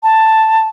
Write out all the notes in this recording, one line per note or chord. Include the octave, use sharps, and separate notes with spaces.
A5